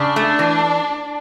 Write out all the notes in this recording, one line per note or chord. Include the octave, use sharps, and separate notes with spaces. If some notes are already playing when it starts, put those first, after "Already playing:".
Already playing: C#3 D4
A3
E3